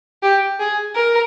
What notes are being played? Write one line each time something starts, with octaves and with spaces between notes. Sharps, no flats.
G4
G#4
A#4